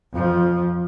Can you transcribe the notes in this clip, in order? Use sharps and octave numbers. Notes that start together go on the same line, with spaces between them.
F2 F3